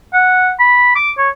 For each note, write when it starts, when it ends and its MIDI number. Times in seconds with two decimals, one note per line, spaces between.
0.13 0.51 78
0.59 0.91 83
0.95 1.11 86
1.18 1.29 73